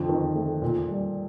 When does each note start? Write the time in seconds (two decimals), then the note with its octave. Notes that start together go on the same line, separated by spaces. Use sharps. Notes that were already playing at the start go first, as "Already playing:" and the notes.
Already playing: F2 D3
0.09 D#3
0.36 A3
0.62 A#2
0.88 G3